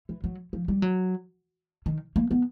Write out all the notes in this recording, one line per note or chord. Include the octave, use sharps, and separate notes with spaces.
E3
F#3
F3
G3
F#3
D#3
A#3
B3